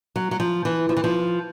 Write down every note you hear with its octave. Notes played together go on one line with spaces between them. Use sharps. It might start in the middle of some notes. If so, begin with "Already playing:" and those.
F#3
F#3
F3
E3
F3
E3
F3